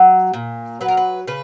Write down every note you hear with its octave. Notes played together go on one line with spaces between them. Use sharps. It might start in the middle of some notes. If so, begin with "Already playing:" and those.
Already playing: F#3
A#2
F#3 B4
A#4
B4
C#3 B4